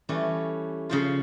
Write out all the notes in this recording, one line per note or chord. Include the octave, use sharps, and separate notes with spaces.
E3 G3 A3 C#4
C#3 F3 F4